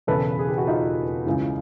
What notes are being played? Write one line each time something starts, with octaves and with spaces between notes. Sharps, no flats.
E1 E2 C#3 E3 A4 B4
G#4
G4
F#4
D#4 F4
C#2 C#3 E3